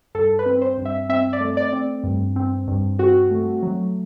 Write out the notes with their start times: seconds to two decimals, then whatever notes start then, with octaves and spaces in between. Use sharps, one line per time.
0.15 G2 A4
0.39 B4
0.46 C4
0.62 C5
0.78 G2
0.85 E5
1.09 C4 E5
1.33 D5
1.40 A3
1.57 D5
1.73 C4
2.03 G2
2.36 C4
2.68 G2
2.99 C4 F#4
3.30 A3
3.63 F#3